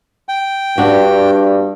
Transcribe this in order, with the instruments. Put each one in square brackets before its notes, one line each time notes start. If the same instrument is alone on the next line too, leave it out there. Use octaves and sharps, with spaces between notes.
[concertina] G5
[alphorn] G2 [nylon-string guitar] B3 D4 F#4